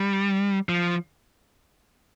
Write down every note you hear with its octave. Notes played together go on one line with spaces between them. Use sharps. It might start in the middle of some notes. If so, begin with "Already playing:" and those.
Already playing: G3
F3